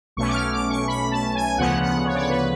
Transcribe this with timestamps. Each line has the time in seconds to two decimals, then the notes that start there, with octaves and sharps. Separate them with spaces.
0.17 B1 B2 A3 C#4 C#6
0.28 D6
0.34 F6
0.53 D6
0.70 C#6
0.88 B5
1.11 A5
1.35 G#5
1.58 D2 C#3 F3 B3 F#5
1.82 F#5
2.05 C#5
2.15 D5
2.22 C#5
2.30 B4